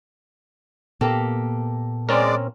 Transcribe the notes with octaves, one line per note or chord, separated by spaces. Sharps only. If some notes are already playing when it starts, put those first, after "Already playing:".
A#2 A#3 B3 G4 A4
G#3 C4 C#4 A#4 D5